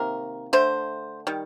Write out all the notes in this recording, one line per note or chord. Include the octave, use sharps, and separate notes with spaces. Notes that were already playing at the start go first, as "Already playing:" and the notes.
Already playing: C3 D#3 A#3 A#4
D3 A3 C5
D#3 G3